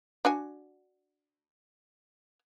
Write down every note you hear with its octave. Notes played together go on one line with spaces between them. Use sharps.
D4 F#4 G#5